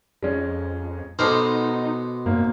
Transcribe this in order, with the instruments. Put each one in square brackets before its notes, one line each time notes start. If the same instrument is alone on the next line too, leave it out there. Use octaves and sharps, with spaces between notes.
[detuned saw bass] F2 [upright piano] G#3 C#4
[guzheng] B2 [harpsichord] G#3 B3 C5 [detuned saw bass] D#4 [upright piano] A4 D6 F6
[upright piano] G#1 A#3 [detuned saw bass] F#2